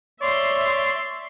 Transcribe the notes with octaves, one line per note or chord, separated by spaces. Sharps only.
C#5 D5 E5 C6